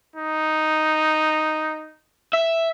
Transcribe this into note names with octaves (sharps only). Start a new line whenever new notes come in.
D#4
E5